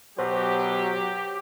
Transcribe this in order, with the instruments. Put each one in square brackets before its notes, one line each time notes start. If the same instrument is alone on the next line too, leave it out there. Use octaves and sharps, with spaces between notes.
[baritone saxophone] B2 [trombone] F#3 [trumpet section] G4 [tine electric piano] C5